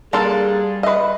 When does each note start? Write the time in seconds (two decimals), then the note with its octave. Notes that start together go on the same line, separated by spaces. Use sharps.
0.13 G3 A#3 D4 G#4 A4 F5 C6 A6
0.83 B4 D#5 E5 B5